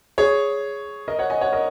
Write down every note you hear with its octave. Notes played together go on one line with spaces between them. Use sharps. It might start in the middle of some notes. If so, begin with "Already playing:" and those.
G#4 C#5
A#4 D#5
C#5 F#5
D#5 G#5
C#5 F#5
A#4 D#5